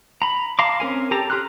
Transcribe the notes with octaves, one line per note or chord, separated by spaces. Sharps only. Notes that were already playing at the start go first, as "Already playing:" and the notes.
A#5 B5
F5 A5 A#5 C6 D6
C4 C#4 A#4 G#5
G4 A4 A5 A#5
G4 A#5 C6 F6 F#6